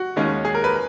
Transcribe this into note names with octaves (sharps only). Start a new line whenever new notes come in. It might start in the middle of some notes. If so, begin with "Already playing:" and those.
Already playing: F#4
D#2 D#3 G#3 C#4
G#4
A#4
B4